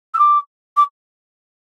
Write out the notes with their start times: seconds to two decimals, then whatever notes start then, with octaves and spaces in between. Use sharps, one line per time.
0.14 E6
0.19 D6
0.77 D6